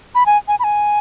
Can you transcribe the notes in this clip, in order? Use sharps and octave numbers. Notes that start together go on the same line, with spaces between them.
B5
G#5
G#5
B5
G#5